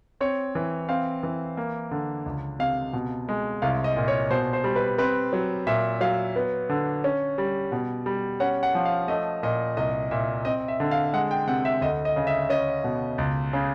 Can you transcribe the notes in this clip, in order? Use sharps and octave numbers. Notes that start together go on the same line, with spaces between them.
C4 C#5
E3
C4 F5
E3
A#3
D3
C#2
C3 F5
B2
G#3
C2 F5
D#5
A#2
C#5
B2 C5
C5
G3
B4
C4 B4
F#3
A#2 E5
F#3 F5
B3
D3
C#4
G3
B2
G3
C#4 F#5
F#5
F3
F5
A3 D#5
A#2 D#5
C2 D#5
A#2 E5
C4 D#5
E5
D3
F5
G#3 F#5
G5
C3 F#5
E5
D2 D#5
D#5
C#3
E5
C#4 D#5
B2
C#2
C#3